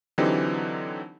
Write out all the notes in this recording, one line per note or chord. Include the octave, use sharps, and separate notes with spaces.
D3 E3 F#3 C4 D#4 G4